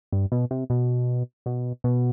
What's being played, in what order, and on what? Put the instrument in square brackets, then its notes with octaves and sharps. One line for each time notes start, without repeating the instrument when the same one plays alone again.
[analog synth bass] G2
B2
C3
B2
B2
B2